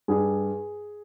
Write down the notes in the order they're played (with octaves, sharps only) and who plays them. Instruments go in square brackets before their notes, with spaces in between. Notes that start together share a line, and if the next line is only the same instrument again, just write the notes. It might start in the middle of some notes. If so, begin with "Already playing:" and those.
[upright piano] G2 G#4